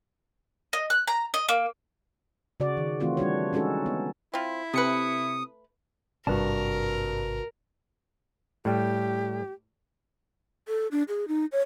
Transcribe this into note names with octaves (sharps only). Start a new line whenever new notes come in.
D#5
F#6
A#5
D#5
A#3
C#3 F#4 D5
D#3
E3 A3 C4 F4 F#4
G3 D4 F#4 C#5
G#3 C#4 D#4 F#4 A4
B3
C4 E4 F4
C3 A3 B4 D#6 C#7
G#1 G2 C3 F#4 A#4 B4 A5
A2 G3 G4
A4
D4
G#4
D#4
C#5